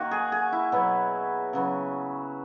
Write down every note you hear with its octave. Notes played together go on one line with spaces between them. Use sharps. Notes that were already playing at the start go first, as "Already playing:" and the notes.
Already playing: D#3 A#3 F#4
G#4
G#4
E4
B2 F#3 B3
C#3 F#3 B3